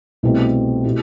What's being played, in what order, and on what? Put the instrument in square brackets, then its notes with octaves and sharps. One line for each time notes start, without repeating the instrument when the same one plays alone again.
[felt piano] C2 B2 A3 C4 G4
B2 A3 E4 G4